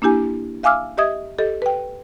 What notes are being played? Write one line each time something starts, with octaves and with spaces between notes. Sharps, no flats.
A#3 D4 E4 G4 G#5
E5 F5 G#5 D6 E6 F6
G4 D#5 E5 D#6 G#6
G4 A4 D#5
B4 G5